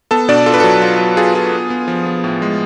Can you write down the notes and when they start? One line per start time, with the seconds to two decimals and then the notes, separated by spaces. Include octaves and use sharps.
0.11 B3 A4 A5
0.28 B2 D4 D5
0.46 F4 A4
0.54 B4
0.60 F#3 A4
0.82 F4
0.99 F#3
1.17 F4 G#4
1.35 F4
1.52 B3
1.70 B3
1.88 F3
2.06 B3
2.24 A2
2.42 G#3